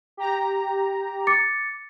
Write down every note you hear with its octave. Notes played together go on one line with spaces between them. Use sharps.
G4 A#5
D6 A6 C#7